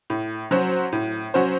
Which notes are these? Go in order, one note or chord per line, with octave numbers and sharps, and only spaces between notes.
A2
F#3 C#4 F#4 C5
A2
F#3 C#4 F#4 C5